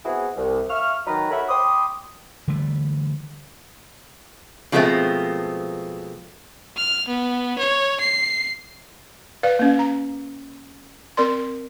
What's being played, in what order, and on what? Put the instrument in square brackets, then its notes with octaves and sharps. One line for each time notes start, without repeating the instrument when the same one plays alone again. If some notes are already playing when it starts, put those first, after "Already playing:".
[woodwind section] B3 C4 E4 F#4 G#4
C2
E5 F5 C#6 F6
D#3 F#3 D#4 B4 A#5
F#4 A4 A#4 C#5 E5 B5
G5 B5 C6 D6 D#6
[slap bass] D3 E3 G3 A3
[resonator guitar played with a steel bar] B2 F3 G#3 A3 B3 C4
[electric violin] F6
B3
C#5
C7
[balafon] B4 D5 F5
A#3 C#4
A#5
C4 A#4 D5 C6